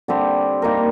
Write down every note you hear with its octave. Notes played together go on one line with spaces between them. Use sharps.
D3 G3 C4 G4
G3 A#3 D#4 A#4